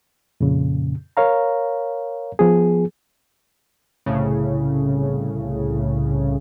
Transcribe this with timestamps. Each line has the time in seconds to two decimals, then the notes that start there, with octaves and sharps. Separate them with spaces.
0.41 F2 A#2 C#3
1.17 A#4 C#5 F5 A#5
2.39 F3 B3 G#4
4.06 C2 A2 C#3